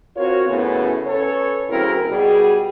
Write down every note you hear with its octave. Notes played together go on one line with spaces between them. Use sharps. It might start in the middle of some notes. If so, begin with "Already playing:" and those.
C4 F4 F#4 A#4 C#5
F#2 A2 C#3 B3
C#4 A4 B4 C#5
D2 C#3 F#3 C4 E4 A#4
B2 G3 G#4